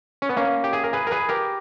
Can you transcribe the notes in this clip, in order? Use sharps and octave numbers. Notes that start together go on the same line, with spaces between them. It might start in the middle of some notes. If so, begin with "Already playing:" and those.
C#4
B3
A#3 C#4
G4
G#4
A#4
G#4 B4
A#4
G#4 B4
G4 A#4